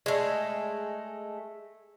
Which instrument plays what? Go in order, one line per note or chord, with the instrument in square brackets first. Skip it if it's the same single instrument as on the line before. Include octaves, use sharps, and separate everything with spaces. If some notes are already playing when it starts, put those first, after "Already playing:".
[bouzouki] G#3 A3